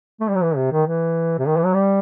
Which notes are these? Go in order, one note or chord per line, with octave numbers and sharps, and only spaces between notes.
A3
G3
F#3
E3
C3
D#3
E3
C3
D#3
E3
F#3
G3